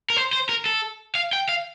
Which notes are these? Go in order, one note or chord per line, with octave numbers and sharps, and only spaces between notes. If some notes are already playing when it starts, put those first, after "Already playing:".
A#4
C5
C5
A#4
A4
F5
G5
F5